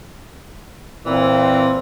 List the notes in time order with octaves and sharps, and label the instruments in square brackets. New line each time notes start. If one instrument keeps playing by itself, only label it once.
[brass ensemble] A#2 C4 [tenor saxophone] E3